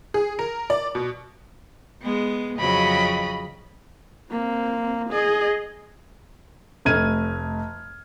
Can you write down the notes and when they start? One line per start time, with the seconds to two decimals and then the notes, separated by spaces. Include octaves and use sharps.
0.14 G#4
0.39 A#4
0.70 D5
0.95 B2
2.02 G#3 B3
2.58 F2 C#3 F#3 D#5 B5
4.31 A#3 C4
5.10 G#4 D#5
6.85 F1 A3 F6 G#6 D#7